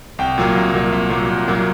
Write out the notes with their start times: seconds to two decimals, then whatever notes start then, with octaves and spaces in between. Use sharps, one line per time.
0.19 C2 G5
0.38 A#2 F#3 A#3
0.56 C2
0.74 A#2 F#3 A#3
0.92 C2
1.10 A#2 F#3 A#3
1.29 C2
1.48 A#2 F#3 A#3